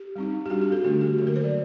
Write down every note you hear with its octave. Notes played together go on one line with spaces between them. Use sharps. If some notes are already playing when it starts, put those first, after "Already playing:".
Already playing: G4
G3 C4 D#4
G4
G3 D4 F#4
G4
A4
D3 A3 D4 F#4
G4
D3 F#3 A#3 A4
A#4
C5
D5